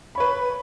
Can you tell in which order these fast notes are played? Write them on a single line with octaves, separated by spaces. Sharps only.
B5 C#5 B4